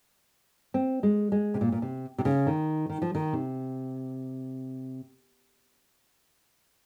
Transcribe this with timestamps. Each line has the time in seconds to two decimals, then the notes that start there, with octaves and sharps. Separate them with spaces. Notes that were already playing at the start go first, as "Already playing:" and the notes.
0.74 C4
1.03 G#3
1.32 G#3
1.54 C3
1.61 A#2
1.72 A#2
1.82 C3
2.18 C3
2.25 C#3
2.47 D#3
2.89 D#3
3.02 F3
3.15 D#3
3.33 C3